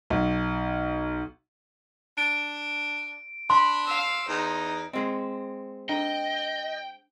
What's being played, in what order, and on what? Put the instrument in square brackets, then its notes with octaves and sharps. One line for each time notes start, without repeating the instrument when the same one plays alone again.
[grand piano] B1
[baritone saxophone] D4 [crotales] D7
[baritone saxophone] D4 [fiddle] B5 [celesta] C6
[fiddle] F5 E6
[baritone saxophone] E2 [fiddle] D#4
[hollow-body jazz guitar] G#3 C4 [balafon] D#5
[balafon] D4 [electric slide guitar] D#5 [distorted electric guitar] G5